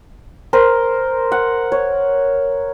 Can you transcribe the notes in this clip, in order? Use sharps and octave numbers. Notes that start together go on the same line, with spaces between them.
A#4 C5
F#5
C#5